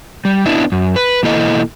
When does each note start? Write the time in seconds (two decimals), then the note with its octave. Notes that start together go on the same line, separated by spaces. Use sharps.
0.25 G3
0.46 B3 D4 E4
0.72 F#2
0.96 B4
1.23 B2 E3 A#3 E4 A4 D#5